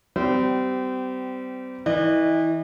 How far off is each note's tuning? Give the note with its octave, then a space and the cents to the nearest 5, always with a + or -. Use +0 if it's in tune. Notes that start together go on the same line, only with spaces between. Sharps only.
G3 -25 C4 -35
E3 -25 D#5 -45